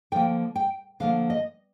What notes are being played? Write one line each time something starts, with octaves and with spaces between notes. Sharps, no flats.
D3 F3 A#3 G5
G5
D3 F3 A#3 F5
D#5